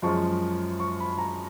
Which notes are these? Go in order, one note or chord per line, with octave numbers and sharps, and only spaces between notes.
F#2 F3 G#3 C#6
C#6
B5
A#5